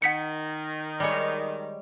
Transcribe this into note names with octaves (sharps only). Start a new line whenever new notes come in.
D#3 F#5 B6 C#7
G3 G#3 C#5